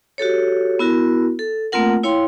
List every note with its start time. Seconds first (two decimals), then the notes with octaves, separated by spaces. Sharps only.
0.18 F#4 G4 A4 C#5
0.79 B3 E4 F#4 A#4
1.39 A4
1.72 A3 A#3 C4 F4 A#4 F#5
2.03 E4 C#5 F5 G5 C6